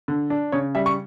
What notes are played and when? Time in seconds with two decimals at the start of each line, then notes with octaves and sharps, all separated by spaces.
0.08 D3
0.30 D4
0.52 C#3 C#5
0.75 G3 E5
0.86 C#6